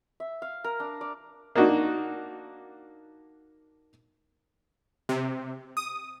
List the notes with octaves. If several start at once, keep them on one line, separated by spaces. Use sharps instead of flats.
E5
F5
A#4
D4
D5
A#3 D4 D#4 F#4
C3
D#6